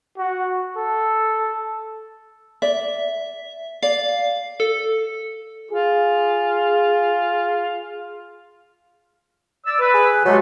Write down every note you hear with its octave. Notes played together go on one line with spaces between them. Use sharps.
F#4
A4
D5 E5
D5 F5
A4
F4 G#4
D5 E6
B4
G#4
C3 F#3 G#3 A3